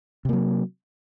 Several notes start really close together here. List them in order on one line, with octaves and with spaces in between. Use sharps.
C3 A#3 F#3